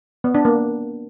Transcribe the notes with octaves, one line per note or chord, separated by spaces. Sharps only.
B3
D4
A#3